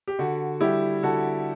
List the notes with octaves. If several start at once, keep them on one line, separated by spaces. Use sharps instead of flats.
G4
D3 F#4
G3 E4 G4
D3 F#4 A4